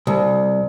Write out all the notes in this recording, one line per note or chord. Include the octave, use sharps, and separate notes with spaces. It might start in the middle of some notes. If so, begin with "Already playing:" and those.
C2